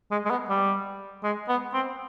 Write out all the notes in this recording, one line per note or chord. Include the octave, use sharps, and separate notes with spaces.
G#3
G#3
B3
G3
G#3
B3
C4